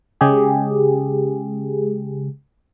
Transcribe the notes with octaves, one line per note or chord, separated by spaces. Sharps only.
C#3 G#3 G4 G#4